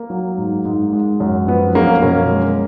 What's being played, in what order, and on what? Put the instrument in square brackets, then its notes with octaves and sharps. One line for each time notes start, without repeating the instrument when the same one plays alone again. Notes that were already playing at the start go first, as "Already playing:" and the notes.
Already playing: [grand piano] A#3
F#3
G#2
G#2
G#3
F#2
F3 B3
F#2 A#3 C#4
B2 A#3 C#4
G#3